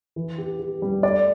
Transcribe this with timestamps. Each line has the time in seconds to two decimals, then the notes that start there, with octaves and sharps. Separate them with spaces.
0.16 E3
0.38 G4
0.60 G4
0.82 G3
1.03 A3 D5